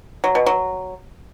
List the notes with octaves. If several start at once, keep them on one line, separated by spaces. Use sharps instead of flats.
F#3
B2
F#3